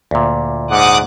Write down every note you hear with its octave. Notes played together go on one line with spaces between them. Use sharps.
D2 A#2
G#2 F#5 D6 D#6 F#6